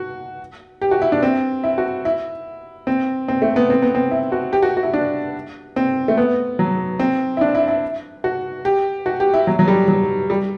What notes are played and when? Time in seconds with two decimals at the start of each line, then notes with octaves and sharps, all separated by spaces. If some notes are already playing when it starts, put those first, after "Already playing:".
Already playing: F#4
0.81 G4
0.91 F#4
1.02 E4
1.12 D4
1.23 C4
1.64 E4
1.78 F#4
2.05 E4
2.87 C4
3.28 C4
3.42 A3
3.56 B3
3.70 C4
3.82 B3
3.95 C4
4.11 E4
4.32 F#4
4.53 G4
4.62 F#4
4.77 F#4
4.83 E4
4.94 D4
5.76 C4
6.08 A3
6.17 B3
6.59 F#3
6.99 C4
7.37 E4
7.41 D4
7.55 E4
7.68 E4
8.24 F#4
8.65 G4
9.06 F#4
9.20 G4
9.34 E4
9.47 F#3
9.59 F#3
9.68 G3
9.88 F#3
10.30 G3